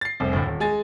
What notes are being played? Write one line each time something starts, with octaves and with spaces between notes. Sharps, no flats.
A6 C7
F1 C2
D2 A2
D#1
G#3 G#5 A6